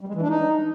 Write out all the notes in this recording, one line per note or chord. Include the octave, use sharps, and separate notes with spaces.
G3
G#3
E3
D4
D#4